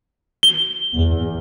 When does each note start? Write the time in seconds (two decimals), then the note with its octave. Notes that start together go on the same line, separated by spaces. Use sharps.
0.43 G7
0.95 E2